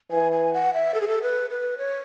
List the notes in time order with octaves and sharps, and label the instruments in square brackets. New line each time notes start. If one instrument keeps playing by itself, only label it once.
[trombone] E3 [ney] G#5
[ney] G#5
F#5
E5
A4
G#4
A4
B4
B4
C#5